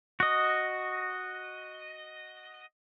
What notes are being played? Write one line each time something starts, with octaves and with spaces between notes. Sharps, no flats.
F#4 D#5